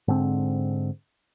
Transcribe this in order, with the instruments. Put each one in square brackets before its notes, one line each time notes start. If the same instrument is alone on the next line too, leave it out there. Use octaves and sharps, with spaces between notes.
[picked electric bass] G#2 D3 C4